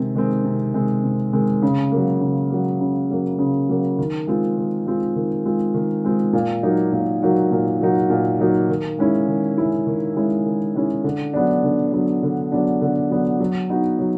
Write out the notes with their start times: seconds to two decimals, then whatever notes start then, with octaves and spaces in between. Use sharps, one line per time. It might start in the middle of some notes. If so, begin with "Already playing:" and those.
Already playing: C3 D#3 G#3 C4
0.15 D#3 G#3 C4
0.45 C3
0.74 D#3 G#3 C4
1.04 C3
1.33 D#3 G#3 C4
1.62 C#3
1.92 F#3 A#3
2.21 C#3
2.50 F#3 A#3
2.80 C#3
3.10 F#3 A#3
3.39 C#3
3.69 F#3 A#3
3.98 D#3
4.27 G#3 C4 F4
4.57 D#3
4.86 G#3 C4 F4
5.16 D#3
5.46 G#3 C4 F4
5.74 D#3
6.04 G#3 C4 F4
6.33 A#2
6.63 F#3 A#3 D#4 F#4
6.92 A#2
7.22 F#3 A#3 D#4 F#4
7.51 A#2
7.81 F#3 A#3 D#4 F#4
8.10 A#2
8.40 F#3 A#3 D#4 F#4
8.69 D#3
8.99 G#3 C#4 E4
9.28 D#3
9.58 G#3 C#4 E4
9.87 D#3
10.16 G#3 C#4 E4
10.45 D#3
10.76 G#3 C#4 E4
11.04 D3
11.33 F#3 B3 D4
11.63 D3
11.93 F#3 B3 D4
12.23 D3
12.52 F#3 B3 D4
12.81 D3
13.11 F#3 B3 D4
13.40 F#3
13.69 B3 D#4 F#4
13.99 F#3